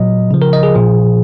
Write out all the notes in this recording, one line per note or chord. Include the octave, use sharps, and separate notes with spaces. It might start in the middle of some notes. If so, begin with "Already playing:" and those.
Already playing: A#2 F#3 D#5
C#3 F3
A#4
D#5
G#4
A#2 F3